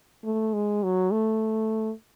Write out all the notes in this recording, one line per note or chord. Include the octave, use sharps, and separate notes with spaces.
A3
G#3
F#3
A3